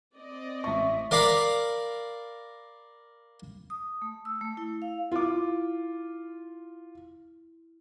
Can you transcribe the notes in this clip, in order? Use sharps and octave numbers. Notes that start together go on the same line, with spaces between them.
C4 D5 D#5
A1 E5 C#6
A#4 D5 F5 A#5 B5
D#6
A3
E6
A3
E4
F5
E4 F4 D6